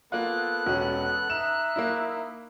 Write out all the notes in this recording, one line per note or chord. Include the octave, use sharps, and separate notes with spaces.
A#3 B3 F4 A4 F#6
E1 C#4
D#4 E5 E7
A#3 E4